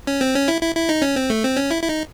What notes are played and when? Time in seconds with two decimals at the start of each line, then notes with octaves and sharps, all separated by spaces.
0.07 C#4
0.21 C4
0.35 C#4
0.48 E4
0.62 E4
0.75 E4
0.89 D#4
1.02 C#4
1.16 C4
1.30 A3
1.44 C4
1.57 C#4
1.71 E4
1.83 E4
1.89 D#4